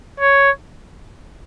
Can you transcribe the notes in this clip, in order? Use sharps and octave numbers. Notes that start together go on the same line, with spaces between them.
C#5